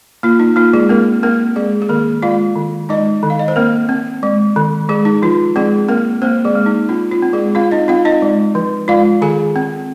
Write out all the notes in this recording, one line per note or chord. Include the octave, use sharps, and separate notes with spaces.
A#3 F4
D#4
A#3 F4
G#3 G#4
A#3 C4 A#4
A#3 C4 A#4
G#3 G#4
G#4
D#3 A#3 A#4
G#3 F4 F5
D#3
G#3 D#4 D#5
D#3
F5
D#5
C5
A#3 C4 A#4
C4
G#3
D#3
G#3 G#4
D#4
F3 F4
G#3 C4 G#4
A#3 C4 A#4
A#3 C4 C5
G#3 G#4
A#3
D#4
C4 F4
F4
C4
G#3 G#4
C4 F4 F5
D#4 D#5
C4 F4 F5
D#4 D#5
G#3
F3
G#3 F4 F5
D#3 G#4 G#5
C4